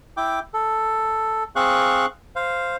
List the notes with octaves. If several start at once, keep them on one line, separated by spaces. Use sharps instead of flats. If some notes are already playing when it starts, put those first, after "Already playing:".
E4 G5 D6
A4
C4 G#4 F5 C#6 F#6
C5 F5